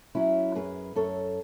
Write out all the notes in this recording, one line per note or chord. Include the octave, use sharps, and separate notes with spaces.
F#3 C#4 E4
F#2 G#4 B4
F#2 A4 C#5